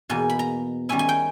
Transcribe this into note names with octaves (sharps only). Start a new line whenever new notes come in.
E2 B2 A#3 D#4 G#5
B5
A#5
D#3 G3 C#4 E4 G#5
G#5
G5